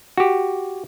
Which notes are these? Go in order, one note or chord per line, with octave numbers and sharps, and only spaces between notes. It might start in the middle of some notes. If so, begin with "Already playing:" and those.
F#4 G4